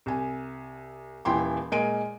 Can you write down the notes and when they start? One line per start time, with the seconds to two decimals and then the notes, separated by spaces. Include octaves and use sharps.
0.06 C2 G#5
1.25 D#1 E3 E4 G5 C6
1.72 A#2 G#3 A#4 D7 D#7